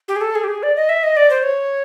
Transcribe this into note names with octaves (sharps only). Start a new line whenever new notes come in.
G4
G#4
A4
G#4
G4
G#4
D5
D#5
E5
D#5
D5
C5
C#5